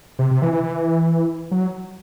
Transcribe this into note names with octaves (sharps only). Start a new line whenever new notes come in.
C3
C3
E3
E3
E3
F#3